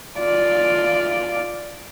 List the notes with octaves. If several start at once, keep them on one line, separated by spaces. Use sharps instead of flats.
F4 D5